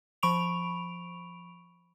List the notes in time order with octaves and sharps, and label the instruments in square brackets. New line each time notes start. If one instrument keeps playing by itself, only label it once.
[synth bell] F3 B5 C#6 D7 F7